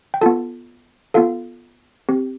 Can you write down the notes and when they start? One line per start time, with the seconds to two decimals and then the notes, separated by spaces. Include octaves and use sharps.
0.14 G5
0.21 B3 F4 A4 A5
1.14 B3 F4 A4 F5
2.09 C4 G4